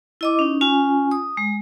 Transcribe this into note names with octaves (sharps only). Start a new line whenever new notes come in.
E4 D#5 D6
C#4 D#4
C#4 F4 G#5
D#6
G#3